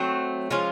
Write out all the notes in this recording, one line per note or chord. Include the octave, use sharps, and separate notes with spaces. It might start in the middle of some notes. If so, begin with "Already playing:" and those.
Already playing: F#3 A3 C4
F3 G#3 C#4 F4